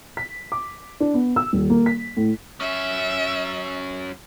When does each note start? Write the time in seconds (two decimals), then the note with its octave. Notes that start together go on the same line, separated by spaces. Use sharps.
0.17 B6
0.52 D6
1.00 D4
1.14 B3
1.36 E6
1.53 D#1
1.70 A#3
1.86 B6
2.17 A2
2.60 F#3 C#4 E5